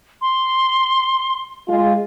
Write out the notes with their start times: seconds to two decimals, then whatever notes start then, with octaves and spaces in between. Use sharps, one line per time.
0.21 C6
1.68 G#3 F4